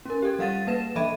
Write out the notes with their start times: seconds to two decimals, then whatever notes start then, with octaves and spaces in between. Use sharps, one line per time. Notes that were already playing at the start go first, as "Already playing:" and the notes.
0.05 C#4 A#4
0.22 G4 A4
0.39 G3 F5 F#5 A6 D#7
0.67 A#3 B4 E7
0.96 E3 A4 D#5 E5 B5 D#7